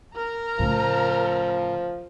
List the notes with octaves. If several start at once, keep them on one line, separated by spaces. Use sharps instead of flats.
A#4 A#5
A2 C#3 F3